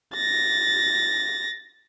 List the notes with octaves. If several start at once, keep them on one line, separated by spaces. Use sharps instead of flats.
A6 A#6